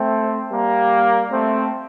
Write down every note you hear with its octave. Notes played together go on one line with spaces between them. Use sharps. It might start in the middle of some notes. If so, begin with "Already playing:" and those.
Already playing: A3 C4
G3 A#3
A3 C4